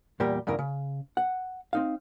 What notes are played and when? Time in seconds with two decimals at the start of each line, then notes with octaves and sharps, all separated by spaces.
0.20 E2 A#2 G3 G4 A#4
0.47 E2 G2 C#3 E3 A#4
0.59 C#3
1.17 F#5
1.73 C4 D#4 F5